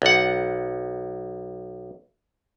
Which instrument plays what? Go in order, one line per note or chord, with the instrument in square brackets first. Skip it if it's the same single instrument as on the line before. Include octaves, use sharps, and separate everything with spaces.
[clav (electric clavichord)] B1 F#5